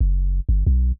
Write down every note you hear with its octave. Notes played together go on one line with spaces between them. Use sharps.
F#1
G1
B1